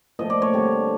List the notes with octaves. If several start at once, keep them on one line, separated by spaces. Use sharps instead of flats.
A#2 F3 A3 D#5
D5
C#5
D3 G3 C4